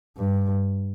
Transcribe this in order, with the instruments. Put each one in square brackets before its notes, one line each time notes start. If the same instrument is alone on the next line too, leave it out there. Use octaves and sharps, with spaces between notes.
[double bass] G2